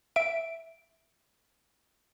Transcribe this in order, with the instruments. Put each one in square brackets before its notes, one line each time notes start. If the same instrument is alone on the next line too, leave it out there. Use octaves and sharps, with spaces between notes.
[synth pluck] E5 D7